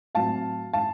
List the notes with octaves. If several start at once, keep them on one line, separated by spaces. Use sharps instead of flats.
A2 F#3 C4 F5 A5
F5 A5